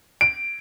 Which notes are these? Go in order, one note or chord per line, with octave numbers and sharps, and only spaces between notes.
D7